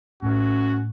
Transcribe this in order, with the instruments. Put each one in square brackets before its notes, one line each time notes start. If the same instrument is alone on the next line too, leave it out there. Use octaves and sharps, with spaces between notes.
[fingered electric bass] A2 [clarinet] C#4 [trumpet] F#4